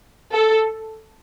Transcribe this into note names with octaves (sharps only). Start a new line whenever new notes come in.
A4